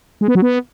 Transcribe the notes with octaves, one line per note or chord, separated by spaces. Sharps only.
G#3
B3
F#3
B3